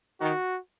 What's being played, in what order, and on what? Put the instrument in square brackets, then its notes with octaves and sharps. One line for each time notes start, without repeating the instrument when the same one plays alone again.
[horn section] D#3 [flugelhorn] F#4